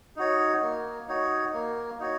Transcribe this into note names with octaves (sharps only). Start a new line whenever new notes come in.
D#4 F#4 C#5
A#3
D#4 F#4 C#5
A#3
D#4 F#4 C#5